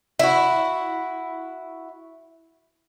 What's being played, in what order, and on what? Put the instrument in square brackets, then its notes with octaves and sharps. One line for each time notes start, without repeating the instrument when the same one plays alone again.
[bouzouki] E4 F#4